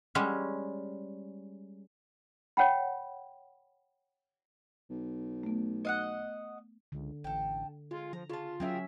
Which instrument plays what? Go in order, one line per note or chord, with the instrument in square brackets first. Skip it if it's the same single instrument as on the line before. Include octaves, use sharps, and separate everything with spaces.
[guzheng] G3 G#3 C#4
[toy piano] C#5 F#5 G5 B5
[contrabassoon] B1
[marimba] A3 B3
[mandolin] D#5 F5 F#5
[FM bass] C#2 [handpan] D3
[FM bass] A1 [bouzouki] A4 G5
[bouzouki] G#3 [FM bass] F4
[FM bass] F3 [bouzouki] A#5
[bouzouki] C#3 A5 [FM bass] F4
[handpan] F#3 C#4 E5 [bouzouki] G4 G#4 A#4